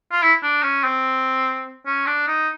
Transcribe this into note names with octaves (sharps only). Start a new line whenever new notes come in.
F4
E4
D4
C#4
C4
C#4
D4
D#4